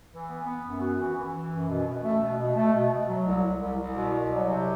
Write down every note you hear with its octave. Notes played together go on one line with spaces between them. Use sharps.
E3
B3
B3
F#2
F#4
E3
E3
E3
F#2
B2
B2
A3
B2
B2
A3
B2
B2
F#3
C2
C2
C2
C2
B2
C2
F#3
C3